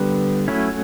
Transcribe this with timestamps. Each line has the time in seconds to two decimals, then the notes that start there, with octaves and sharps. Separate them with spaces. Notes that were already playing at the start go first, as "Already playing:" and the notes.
Already playing: D3 G3 B3 B4
0.48 F#3 A3 C#4 E4